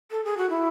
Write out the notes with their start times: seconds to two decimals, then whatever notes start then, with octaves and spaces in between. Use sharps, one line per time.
0.11 A4
0.25 G#4
0.37 F#4
0.49 E4